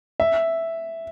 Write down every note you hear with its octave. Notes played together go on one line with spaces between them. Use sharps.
E5